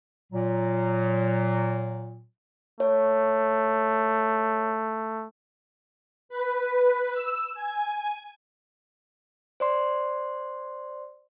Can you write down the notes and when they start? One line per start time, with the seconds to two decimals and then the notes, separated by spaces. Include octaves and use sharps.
0.32 A#2 F#3
2.80 A3 C#5
6.29 B4
7.12 E6
7.54 G#5
9.60 C5 D5 C6